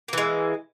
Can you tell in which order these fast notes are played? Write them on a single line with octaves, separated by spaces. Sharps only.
A#3 E3 G#3